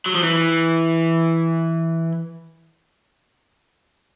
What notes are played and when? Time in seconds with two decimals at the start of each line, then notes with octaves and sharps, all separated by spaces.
0.06 F#3
0.15 F3
0.23 E3